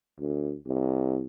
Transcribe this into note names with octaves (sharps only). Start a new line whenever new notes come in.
D2
C2